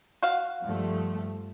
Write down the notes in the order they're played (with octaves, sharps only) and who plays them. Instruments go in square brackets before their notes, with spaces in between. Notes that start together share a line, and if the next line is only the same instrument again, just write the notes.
[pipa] F#4 F5
[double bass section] G2 F3 A3